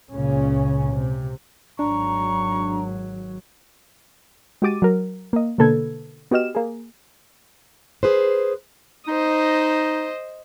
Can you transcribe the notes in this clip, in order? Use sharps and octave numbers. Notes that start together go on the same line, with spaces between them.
C#2 A#2 C#3 C#4
C3
G#1 F#3 D4 A#5 C#6
G#3 F#4 G4 D6 A6 D#7
F#3 A#4
A#3 D#5
B2 D3 A#3 A4 B4 G#6
B3 F#4 G4 D#5 F6 E7
A#3 G#4
G#4 B4 C5
D#4 C5 D#5